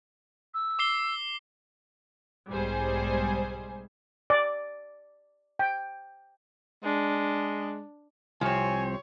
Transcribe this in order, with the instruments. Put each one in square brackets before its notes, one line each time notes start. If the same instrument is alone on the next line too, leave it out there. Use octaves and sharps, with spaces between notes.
[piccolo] E6
[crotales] D6 C7 G7
[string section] B1 G#2 G3 G#4 C5 G#5
[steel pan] D5
G5
[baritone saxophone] G#3 [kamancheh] D4
[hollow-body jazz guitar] C2 [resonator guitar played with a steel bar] F3 C4 [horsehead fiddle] C#5 [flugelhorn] G#5